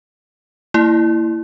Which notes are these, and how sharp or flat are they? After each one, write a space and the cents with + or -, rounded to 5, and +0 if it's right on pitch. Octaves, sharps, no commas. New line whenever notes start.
A#3 -35 E4 +5